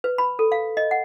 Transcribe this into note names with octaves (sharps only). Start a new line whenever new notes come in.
B4
B5
A4
F5
D#5
F#5